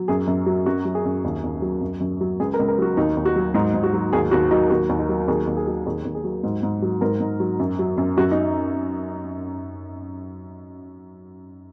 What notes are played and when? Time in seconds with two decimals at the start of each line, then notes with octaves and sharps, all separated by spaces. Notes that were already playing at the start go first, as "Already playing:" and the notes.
Already playing: F#3
0.08 F#2 G#4
0.27 F#2
0.46 F#3
0.66 F#2 F#4
0.85 F#3
0.95 G#4
1.05 F#2
1.24 D#2
1.44 D#2
1.62 F#3
1.81 F#2
2.00 F#2
2.21 F#3
2.40 C#2 G#4
2.54 A#4
2.59 C#2
2.68 A#4
2.78 F#3 F#4
2.97 D#2 D#4
3.17 D#2
3.25 F#4
3.36 F#3
3.54 G#2 D#4
3.74 G#2
3.83 F#4
3.93 F#3
4.13 D#2 G#4
4.31 D#2 F#4
4.51 F#3 D#4
4.70 D#2 F#4
4.89 D#2
4.99 D#4
5.09 F#3
5.28 D#2 G#4
5.47 D#2
5.57 G#4
5.67 F#3
5.85 D#2 G#4
6.05 D#2
6.15 G#4
6.24 F#3
6.43 G#2
6.63 G#2
6.82 F#3
7.01 G#2 A#4
7.20 G#2
7.40 F#3
7.59 F#2
7.79 F#3
7.97 F#2
8.17 F#2 F#4
8.31 D#4